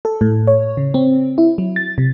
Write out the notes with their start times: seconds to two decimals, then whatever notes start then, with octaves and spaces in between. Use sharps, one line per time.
0.05 A4
0.21 A2
0.47 C#5
0.77 C#3
0.94 C4
1.38 E4
1.58 F#3
1.76 A6
1.98 C3